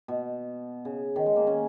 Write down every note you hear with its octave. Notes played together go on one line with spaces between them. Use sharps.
B2
C#3
D#3
G#3
A#3
C#4